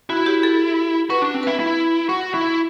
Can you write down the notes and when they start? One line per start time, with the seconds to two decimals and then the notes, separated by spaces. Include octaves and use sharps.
0.09 E4 F#4
0.26 G4
0.43 A4
1.10 F#4 B4
1.22 D4
1.34 C4
1.43 E4 B4
1.60 E4
2.09 F#4
2.34 E4